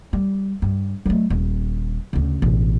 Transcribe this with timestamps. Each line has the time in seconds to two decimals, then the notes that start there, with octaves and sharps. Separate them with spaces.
0.13 G3
0.62 G2
1.06 F#3 A3
1.30 D#1
2.13 D2 C#3
2.42 A1 B2